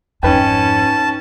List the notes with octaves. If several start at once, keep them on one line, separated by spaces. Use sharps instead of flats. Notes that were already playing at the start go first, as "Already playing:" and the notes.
F2 G#2 C#4 D#4 B4 G5 A5